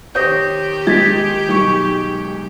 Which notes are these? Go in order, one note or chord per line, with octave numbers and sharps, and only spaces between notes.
D#3 G4 C5 C#5 D#6 G6 A#6
G#3 G#6 A6 B6
B1 C#6